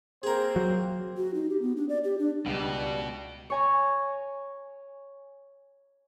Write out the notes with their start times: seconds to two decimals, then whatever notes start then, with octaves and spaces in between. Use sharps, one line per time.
0.23 A#3 C4 G#4 A#4 C5
0.56 F#3
1.17 F#4
1.34 D#4
1.50 G4
1.62 B3
1.77 D4
1.89 D5
2.04 G4
2.18 D4
2.46 C#2 B2 G3
3.50 C#5 G#5 A#5